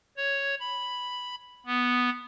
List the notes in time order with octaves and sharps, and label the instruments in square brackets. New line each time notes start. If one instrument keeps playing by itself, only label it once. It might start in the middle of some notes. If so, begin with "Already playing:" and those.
[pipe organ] C#5
B5
B3